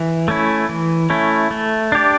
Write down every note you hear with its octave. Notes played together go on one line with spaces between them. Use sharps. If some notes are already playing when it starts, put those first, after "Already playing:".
Already playing: E3
A3 C#4 E4
E3
A3 C#4 E4
A3
D4 G4 D5